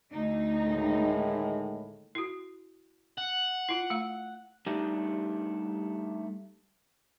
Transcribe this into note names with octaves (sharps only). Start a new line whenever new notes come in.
D2 D#4
A2 D#3 G#3
E4 F#4
F#5
E4 F4
A3 F5
G3 A3 D4 D#4 G4